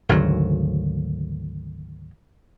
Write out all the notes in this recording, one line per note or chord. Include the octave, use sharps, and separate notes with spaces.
G#1 D2 C#3 F#3